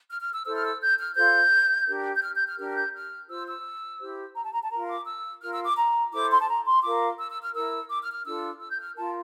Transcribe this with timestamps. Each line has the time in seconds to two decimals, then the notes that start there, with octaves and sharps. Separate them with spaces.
0.10 F6
0.21 F6
0.34 E6
0.46 E4 A4 C5 E6
0.55 F6
0.65 E6
0.81 G6
0.99 F6
1.16 F4 A4 C5 G6
1.87 D4 G4 A#4
2.15 G6
2.23 F6
2.35 G6
2.47 F6
2.58 D4 G4 A#4 F6
2.69 F6
2.76 G6
2.94 F6
3.29 F4 C5 E6
3.47 E6
4.00 E4 G4 C5
4.35 A#5
4.44 A5
4.53 A#5
4.62 A5
4.70 F4 A#4 A#5
4.89 D6
5.07 E6
5.41 F4 A#4 F6
5.53 E6
5.65 D6
5.77 A#5
6.12 E4 A4 C5 D6
6.30 C6
6.41 A5
6.48 A#5
6.66 C6
6.83 F4 A#4 D6
7.19 E6
7.30 E6
7.42 F6
7.54 E4 A#4 E6
7.90 D6
8.02 F6
8.14 F6
8.25 D4 F4 A4 E6
8.61 E6
8.70 G6
8.79 F6
8.96 F4 A#4 A5